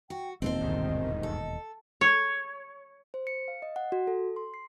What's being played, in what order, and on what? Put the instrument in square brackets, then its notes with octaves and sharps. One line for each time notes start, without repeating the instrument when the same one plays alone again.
[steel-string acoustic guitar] F#4 [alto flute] G5
[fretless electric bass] E1 D#2 A#2 [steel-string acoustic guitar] C4 A4 C5 [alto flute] D#5
[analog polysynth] C2 G#2 D#3
[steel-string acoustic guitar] A4
[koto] C#5
[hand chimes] C5
C#7
F5
D#5
F#5
F#4
A4
C6
C7